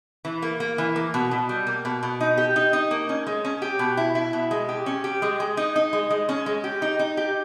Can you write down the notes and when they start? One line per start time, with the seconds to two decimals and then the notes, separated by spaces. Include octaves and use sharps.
0.25 E3
0.42 A#3
0.60 A#3
0.78 E3
0.96 A#3
1.14 B2
1.31 B2
1.49 G3
1.67 A#3
1.85 B2
2.03 B2
2.21 D#4
2.38 G4
2.56 D#4
2.73 D#4
2.91 A#3
3.09 C#4
3.27 G#3
3.45 C#4
3.62 G4
3.79 B2
3.97 E4
4.15 E4
4.33 B2
4.51 G#3
4.69 G4
4.86 C#4
5.04 G4
5.22 G#3
5.40 G#3
5.57 D#4
5.76 D#4
5.93 G#3
6.10 G#3
6.29 C#4
6.46 G#3
6.64 G4
6.82 D#4
6.99 D#4
7.17 G4